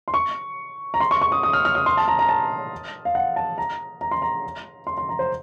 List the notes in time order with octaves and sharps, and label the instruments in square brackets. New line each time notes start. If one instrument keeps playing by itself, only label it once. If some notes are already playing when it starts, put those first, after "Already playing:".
[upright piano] C6
C#6
A#5
C6
C#6
C#6
D#6
D#6
F6
F6
D#6
C6
A5
A#5
A#5
A5
F5
F#5
A5
A#5
A#5
C6
A#5
C6
C6
A#5
C5